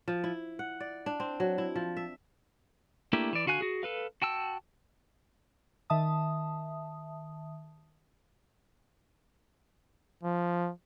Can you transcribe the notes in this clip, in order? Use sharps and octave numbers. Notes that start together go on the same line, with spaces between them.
F3
E4
F#5
D5
D4
C4
F#3
E4
F3
E5
A3 A#3 D4 E4 G4
E3 D5
D3 F#4 F5 G#5 F#6
F#4 G#4
A4 B4 F5
F#4 G5 A5 E6
D#3 E5 A5 D#6
F3